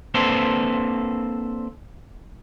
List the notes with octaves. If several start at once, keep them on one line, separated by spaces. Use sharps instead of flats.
A#3 C4 D4 A4 B4 C5